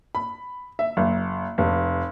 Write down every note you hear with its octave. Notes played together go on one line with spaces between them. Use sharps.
B5
E5
F#1
F1